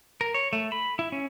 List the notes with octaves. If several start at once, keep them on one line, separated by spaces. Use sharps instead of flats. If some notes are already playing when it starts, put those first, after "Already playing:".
A#4
C#5
A3
B5
E4
C#4